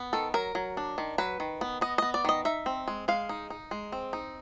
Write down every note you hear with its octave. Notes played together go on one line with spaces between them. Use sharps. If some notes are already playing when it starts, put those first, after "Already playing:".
Already playing: B3
D#3 A4
F#3 A#4
F#3
D4
D#3
F#3 B4
D#3
B3
B3 D#5
B3 D#5
D5
D#3 D#5
D#4 E5
C4
G#3
G#3 F5
D#4
D#4
G#3
C4
D#4